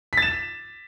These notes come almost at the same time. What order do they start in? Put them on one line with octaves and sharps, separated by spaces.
B6 A6 E7